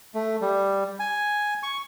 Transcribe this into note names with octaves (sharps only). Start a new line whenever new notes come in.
A3
G3
G#5
C#6